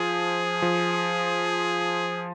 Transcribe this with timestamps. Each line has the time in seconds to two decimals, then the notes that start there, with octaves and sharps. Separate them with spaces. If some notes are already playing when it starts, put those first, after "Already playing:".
Already playing: F3 G#4
0.62 F3